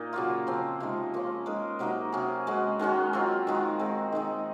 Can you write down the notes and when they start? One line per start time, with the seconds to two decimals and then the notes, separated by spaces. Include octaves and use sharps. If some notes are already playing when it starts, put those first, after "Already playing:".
Already playing: A#2 D#4
0.13 C#3 F#3 A#3 F4
0.47 C#3 F3 C4
0.80 C3 F3 G#3 D#4
1.14 F3 A#3 C#4
1.46 G#3 D#4 A#4
1.79 C3 F#3 A#3 D#4
2.12 C3 F#3 C#4 G#4
2.47 G#3 C#4 F#4
2.79 D#3 G#3 C#4 F#4
3.13 F#3 C4 F4
3.47 D#3 G#3 D#4 F#4
3.79 G#3 C4 F#4
4.12 D#3 G#3 D#4